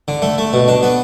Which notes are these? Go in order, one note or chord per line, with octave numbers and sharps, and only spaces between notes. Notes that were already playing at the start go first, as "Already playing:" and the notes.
D3
A3
A3
B2
D4
B3